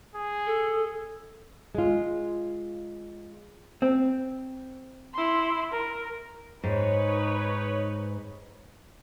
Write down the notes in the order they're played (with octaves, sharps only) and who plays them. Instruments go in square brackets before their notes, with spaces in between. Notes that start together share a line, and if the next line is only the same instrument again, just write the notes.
[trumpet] G#4
[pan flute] A4
[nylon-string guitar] G#3 F4
[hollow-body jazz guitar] C4
[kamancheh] E4 C6
A#4
[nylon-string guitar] G#2 [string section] D#4 B4 C#5